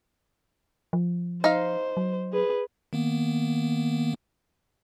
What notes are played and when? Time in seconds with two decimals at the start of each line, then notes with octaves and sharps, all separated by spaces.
0.93 F3
1.44 D#4 C5 F5
1.97 F#3
2.33 G#4 B4
2.93 D#3 A#3 B3